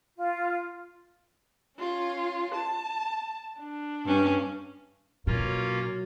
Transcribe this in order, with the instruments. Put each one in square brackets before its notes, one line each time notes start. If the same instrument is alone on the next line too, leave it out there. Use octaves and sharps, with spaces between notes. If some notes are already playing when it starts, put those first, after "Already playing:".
[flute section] F4
[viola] C#4 F4
A5
D4
[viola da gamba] G2 C#4
[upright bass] B2 [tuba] F#3 [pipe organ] A#3 C#4 F4